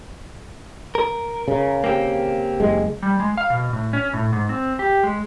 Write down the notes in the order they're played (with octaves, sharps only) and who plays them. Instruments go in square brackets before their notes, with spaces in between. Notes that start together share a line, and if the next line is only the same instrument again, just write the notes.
[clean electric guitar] A#4
[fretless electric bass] C#3
[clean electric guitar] A#3 C4 G4
[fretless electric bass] F#1 G#3
[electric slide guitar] G3
G#3
F5
B2
A2
C#4
A2
G#2
C4
G4
G#3